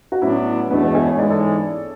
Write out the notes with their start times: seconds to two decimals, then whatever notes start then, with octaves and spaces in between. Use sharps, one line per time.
0.12 F#4
0.22 A2 F#3 B3 C#4 D4 E4
0.71 E2 B2 A3 B3 D4
0.83 G#3 B3
0.95 E4 G#4
1.07 C#5
1.19 G#2 E3 G#3 D5
1.30 A4 C#5